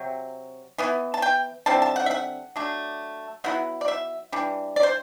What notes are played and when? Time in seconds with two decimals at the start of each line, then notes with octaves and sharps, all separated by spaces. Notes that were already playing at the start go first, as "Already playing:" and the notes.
Already playing: C3 F#3
0.78 E3 B3 E4
1.14 A5
1.22 G5
1.66 D3 G3 C4 E4 A5
1.82 A5
1.96 F#5
2.06 E5
2.11 F#5
2.56 F#3 A3 D4
3.44 F#3 B3 E4 F#5
3.81 D5
3.88 E5
4.32 E3 G3 D4
4.76 D5
4.83 C5